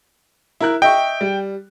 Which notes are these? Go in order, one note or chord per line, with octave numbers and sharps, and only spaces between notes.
E4 A#4 F#6
D#5 E5 G5 C#6
G3